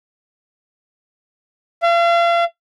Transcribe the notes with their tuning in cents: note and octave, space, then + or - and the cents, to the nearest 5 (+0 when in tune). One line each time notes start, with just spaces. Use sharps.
F5 -40